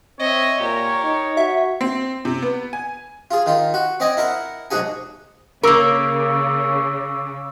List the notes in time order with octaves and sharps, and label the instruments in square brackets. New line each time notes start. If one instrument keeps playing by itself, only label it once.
[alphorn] C4 [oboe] C#5 [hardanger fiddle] D#5 E5
[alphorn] A#2 [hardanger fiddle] G4 A#4
[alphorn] D#4 [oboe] C#5
[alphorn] F#4 [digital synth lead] E5
[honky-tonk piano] C4
C3
B3
G#5
[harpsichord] F4 G#4
D#3 F4
F#4
C4 D5 D#5 G#5
E4 A#4 F#5
B1 G#2 F#4 G#4 G#5
[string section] C#3 [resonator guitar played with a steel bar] A#3 A#4 [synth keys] C#6 D6 E6